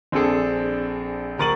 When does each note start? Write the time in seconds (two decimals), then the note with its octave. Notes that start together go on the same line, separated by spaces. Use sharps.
0.12 A#1 C4 D4 G#4 A4
1.39 D1 A#4 C#6 A6 D#7 F#7